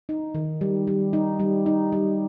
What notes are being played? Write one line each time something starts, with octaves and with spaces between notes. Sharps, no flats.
D#4
D#3
G3
G3
D#4
G3
D#4
G3